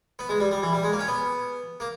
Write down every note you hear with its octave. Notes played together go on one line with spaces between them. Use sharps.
B3
G#3
G3
G3
E3
G3
G#3
A#3
C#4
B3
A#3